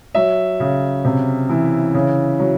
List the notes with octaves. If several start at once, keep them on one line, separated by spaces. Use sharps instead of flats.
F#3 E5
C#3
C3
E3
C#3
F#3